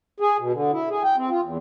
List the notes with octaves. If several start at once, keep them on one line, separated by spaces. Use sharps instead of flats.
G#4
B2
D3
E4
G#4
G5
C4
F4
E2